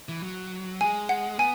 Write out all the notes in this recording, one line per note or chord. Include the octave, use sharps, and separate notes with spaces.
E3
F#3
G#3 G#5
F#5
B3 G#5